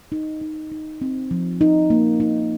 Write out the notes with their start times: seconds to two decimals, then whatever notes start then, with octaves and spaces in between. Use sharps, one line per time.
0.12 D#4
0.41 D#4
0.72 D#4
1.01 C4
1.31 F3
1.61 D#4
1.90 A#3
2.20 D#4